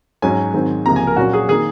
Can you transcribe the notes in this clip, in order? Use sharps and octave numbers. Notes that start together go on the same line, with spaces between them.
G#2 F#3 C#4 G#5
G#2 D#3 F#3 C4
C#2 C3 F3 A#3 A#5
G#5
A#4
A#2 F#3 C#4 F#4
G#4
D#3 A#3 G#4